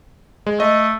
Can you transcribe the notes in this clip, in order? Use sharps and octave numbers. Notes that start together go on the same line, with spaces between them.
G#3
A3 D#5